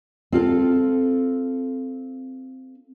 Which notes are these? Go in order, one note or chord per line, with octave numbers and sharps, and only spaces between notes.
C4 F4 A4